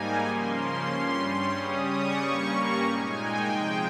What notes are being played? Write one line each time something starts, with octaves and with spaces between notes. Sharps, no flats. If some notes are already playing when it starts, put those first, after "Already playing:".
Already playing: G#2 G3 A#3 D#4 G#5
C#3 F3 A#3 C#4 C6
C6
G2 G3 C#4
C#3 G3 C#4 D#6
C#6
G2 G3 A#3 C#4
A#5
A#2 G#3 D#4 G#5
G5
C3 F3 G#3